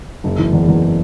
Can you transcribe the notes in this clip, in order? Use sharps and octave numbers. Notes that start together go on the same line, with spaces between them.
F#1
E3
E2
E2